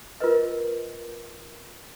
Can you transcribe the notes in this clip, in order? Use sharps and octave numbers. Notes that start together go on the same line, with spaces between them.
F4 A#4 B4 D#5